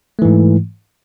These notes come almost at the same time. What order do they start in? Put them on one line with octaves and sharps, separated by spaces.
A3 E3 G#2